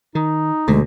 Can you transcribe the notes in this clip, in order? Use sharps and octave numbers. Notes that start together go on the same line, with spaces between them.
D#3 D#4
D2 B2 G#3